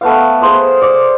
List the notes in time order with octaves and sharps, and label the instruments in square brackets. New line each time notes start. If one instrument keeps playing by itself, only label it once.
[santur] A3 B3 F5
G#4 C5 C6 D#6
D5